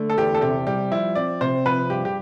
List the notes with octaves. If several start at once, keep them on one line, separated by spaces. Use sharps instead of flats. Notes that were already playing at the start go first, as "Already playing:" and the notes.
Already playing: D3 A3
A4
E2 G4
A4
C3 G4
G3 G4
F3 E4
C4 D5
C3 C5
F3 B4
G2 G4
G4